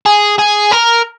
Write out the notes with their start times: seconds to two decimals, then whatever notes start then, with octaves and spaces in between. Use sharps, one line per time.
0.06 G#4
0.38 G#4
0.71 A#4